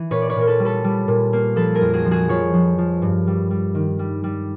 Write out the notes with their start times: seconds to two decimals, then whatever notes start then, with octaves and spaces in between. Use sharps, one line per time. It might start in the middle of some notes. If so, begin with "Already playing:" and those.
Already playing: E3
0.11 A#2 B4 C#5
0.22 D5
0.30 B4 C#5
0.36 A#2 A#4
0.47 A4 B4
0.59 G3
0.65 A4 B4
0.84 G3
1.08 A#2
1.33 A#3
1.56 F3 A4 B4
1.75 G#4 A#4
1.82 F2
1.93 F#4 G#4
2.05 F3
2.11 F#4 G#4
2.29 F3 B4 C#5
2.54 F3
2.78 F3
3.02 G2
3.27 G3
3.50 G3
3.75 D#3
3.99 G3
4.24 G3